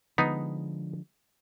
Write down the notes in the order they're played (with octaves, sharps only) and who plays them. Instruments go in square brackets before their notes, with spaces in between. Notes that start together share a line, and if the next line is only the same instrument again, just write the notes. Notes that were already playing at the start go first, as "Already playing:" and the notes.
[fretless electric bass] D3 F3 G#3 [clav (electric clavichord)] B3 D#4